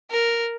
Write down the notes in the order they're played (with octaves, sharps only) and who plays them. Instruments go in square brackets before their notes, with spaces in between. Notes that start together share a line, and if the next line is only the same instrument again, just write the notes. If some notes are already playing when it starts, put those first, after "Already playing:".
[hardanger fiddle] A#4